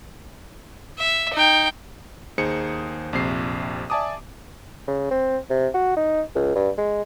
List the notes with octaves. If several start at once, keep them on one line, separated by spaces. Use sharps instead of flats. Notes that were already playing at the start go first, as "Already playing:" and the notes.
E5
D#4 G5
D#2 D#4 G#4 C5 D#6 C#7
A#1 F2 C3 C7
D5 E5 G#5 A5 D6 D#6
C#3
C4
C3
F#4
D#4
C#2
G2
G#3